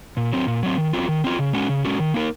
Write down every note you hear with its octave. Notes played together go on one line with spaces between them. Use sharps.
A#2
F#3 C4
A#2
F#3 C4
D#3
F#3 C4 F4
D#3
F#3 C4 F4
C#3
G#3 C#4 F#4
C#3
G#3 C#4 F#4
D#3
A#3 D#4 A#4